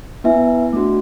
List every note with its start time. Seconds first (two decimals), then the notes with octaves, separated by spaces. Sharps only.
0.24 B3 E4 B4 E5 G#5
0.73 A3 D4 F#4